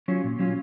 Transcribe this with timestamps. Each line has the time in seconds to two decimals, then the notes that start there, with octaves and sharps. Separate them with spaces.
0.08 F#3 C#4 F4
0.24 A#2
0.39 F#3 C#4 F4